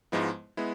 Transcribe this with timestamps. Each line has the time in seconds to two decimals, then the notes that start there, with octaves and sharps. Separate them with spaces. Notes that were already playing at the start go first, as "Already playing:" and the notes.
0.12 G#2 F3 G#3 B3 E4
0.57 G#3 B3 E4